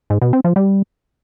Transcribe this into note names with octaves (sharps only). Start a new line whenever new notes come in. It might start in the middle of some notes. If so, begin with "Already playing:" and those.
G#2
B2
C4
F3
G3